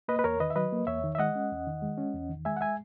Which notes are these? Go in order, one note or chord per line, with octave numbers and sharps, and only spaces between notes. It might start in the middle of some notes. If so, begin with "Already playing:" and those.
A#3 B4 D#5
B4
E2 A#4 C#5
D#3 B4 D#5
E5
F#3 B4 D#5
A#3
E2 C#5 E5
D#3
E5
G#3 D#5 F#5
C#4
E2
D#3
G#3
C#4
E2
D#3
G#3 E5 G#5
F#5
E5 G#5